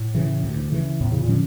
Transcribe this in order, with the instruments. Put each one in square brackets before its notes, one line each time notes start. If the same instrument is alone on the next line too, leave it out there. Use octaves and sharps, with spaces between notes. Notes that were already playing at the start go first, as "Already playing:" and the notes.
Already playing: [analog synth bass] A2
[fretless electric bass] C#3 E3
D2
C#3 E3
[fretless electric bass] E2 [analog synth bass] A2
[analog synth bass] C#3
A#2
[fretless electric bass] D3 F3 C#4